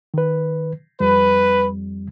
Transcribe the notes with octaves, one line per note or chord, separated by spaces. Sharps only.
D#3 B4
F2 G3 B4